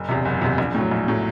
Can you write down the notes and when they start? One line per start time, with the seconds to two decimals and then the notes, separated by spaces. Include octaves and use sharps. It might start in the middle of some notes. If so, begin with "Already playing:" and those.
Already playing: F#1
0.08 E2 C3
0.25 F#1
0.42 E2 C3
0.58 A#1
0.74 A2 F#3
0.91 A#1
1.08 A2 F#3